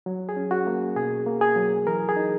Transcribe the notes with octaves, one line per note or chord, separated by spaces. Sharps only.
F#3
G#4
C#4
F#4
A#3
B2 G#4
A#3
G#4
F#3
E3 A#4
G#4
D#4